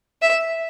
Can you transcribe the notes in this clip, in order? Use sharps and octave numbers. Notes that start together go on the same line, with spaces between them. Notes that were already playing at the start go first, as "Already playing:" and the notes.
E5